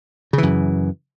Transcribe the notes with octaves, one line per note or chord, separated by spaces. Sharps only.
F#2 C#3 E3